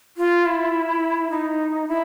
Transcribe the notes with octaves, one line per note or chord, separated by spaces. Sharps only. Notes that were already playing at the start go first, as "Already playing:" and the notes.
F4
E4
D#4
E4